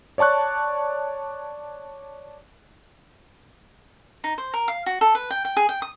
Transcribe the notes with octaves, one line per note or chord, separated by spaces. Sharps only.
C#5 D5 A5 C#6 F#6
D#4
C5
A#4
F5
F#4
A4
B4
G5
G5
G#4
G5
D#6